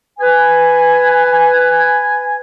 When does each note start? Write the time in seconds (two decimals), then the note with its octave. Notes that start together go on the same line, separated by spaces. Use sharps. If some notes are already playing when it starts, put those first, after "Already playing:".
0.20 B4 G#5